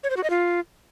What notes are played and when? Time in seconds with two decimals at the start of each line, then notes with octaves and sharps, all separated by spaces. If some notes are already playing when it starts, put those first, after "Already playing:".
0.04 C#5
0.10 C5
0.17 F#4
0.23 D#5
0.30 F4